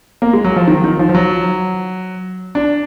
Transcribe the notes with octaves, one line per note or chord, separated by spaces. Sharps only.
A#3
G#3
F#3
F3
D#3
D#3
F3
F3
F#3
D4